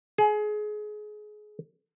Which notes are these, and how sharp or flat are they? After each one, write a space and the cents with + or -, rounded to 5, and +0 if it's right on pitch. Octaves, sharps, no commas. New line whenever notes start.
G#4 +25